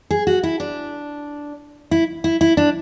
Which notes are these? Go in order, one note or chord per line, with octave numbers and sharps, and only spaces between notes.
G#4
F#4
E4
D4
E4
E4
E4
D4